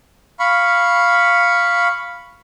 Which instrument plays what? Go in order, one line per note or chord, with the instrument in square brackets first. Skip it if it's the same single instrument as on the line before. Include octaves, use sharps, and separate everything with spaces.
[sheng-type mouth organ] F5 B5 C#6